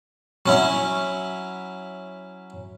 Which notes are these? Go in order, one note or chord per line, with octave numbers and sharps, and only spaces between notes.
F#3 C#4 E4